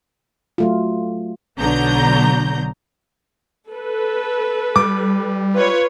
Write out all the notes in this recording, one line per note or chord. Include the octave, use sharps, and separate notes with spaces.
F#3 A3 F4
B1 D3 F#3 B3 A#5 G6
A4 B4
G3 D6
F4 B4 C#5